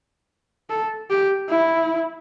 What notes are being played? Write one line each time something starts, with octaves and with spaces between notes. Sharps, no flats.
A4
G4
E4